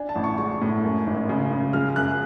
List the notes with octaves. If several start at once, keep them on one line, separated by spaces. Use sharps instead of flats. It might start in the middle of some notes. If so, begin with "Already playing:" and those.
Already playing: D4 G#5
A5
A1
C#6
G#3 C#6
A2
F#2
G#1
C#3
C#3
G#3 F6
F#2 F#6